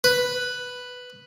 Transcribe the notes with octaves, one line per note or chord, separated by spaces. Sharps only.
B4